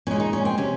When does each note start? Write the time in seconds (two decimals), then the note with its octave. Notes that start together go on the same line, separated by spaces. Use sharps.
0.07 A#2 G#3 C#4
0.20 D#4
0.33 C#4
0.45 C4
0.58 C3 C#4